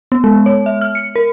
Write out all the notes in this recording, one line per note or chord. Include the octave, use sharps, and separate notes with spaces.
B3
G#3
C#5
E5
F6
C#7
A#4